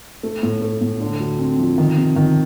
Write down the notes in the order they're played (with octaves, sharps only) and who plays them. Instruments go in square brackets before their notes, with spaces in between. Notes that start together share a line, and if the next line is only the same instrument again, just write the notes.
[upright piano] A3
A2
A3
A2
D3
D2
C4
F3
D#3
C3
D#3